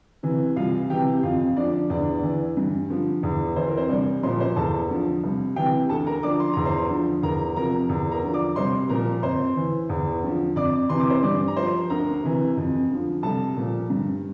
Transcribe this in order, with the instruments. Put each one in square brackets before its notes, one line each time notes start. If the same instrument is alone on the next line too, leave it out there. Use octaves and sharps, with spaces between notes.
[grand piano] C3 E3
C2 F4 F5
C3 E3 G4 G5
F2 F4 F5
D3 F3 D4 D5
E2 D4 D5
E3
G2
D3 F3
E2
E3 C5
A#4
C4 C5
C2 D4 D5
A#2 F3 C5 C6
C5 C6
E2 A4 A5
D3 F3
C2
C3 E3 G4 G5
D2 A4 A5
A#4 A#5
D3 F3 D5 D6
C6
E2 A#5
C5 C6
D3 F3
E2 A#4 A#5
C3 F3 A#4 A#5
E2
A#4 A#5
D3 F3
D5 D6
C2 C5 C6
A#2 F3 A#4 A#5
F2 C5 C6
E3
E2
D3 F3
F2 D5 D6
C3 E3 C6
D6
C5 C6
G2 D5 D6
A#5
F3 C5 C6
D2 A#4 A#5
C3 E3
F2
D3 F3
C2 A4 A5
A#2 F3
G2